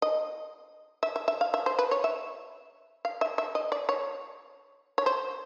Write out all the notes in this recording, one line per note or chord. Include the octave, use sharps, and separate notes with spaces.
D#5
E5
E5
E5
F5
E5
C5
B4
C#5
E5
F5
E5
E5
D#5
D5
C#5
C#5
C5